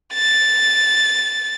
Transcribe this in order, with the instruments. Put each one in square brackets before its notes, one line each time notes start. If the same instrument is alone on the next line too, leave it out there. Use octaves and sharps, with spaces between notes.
[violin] A6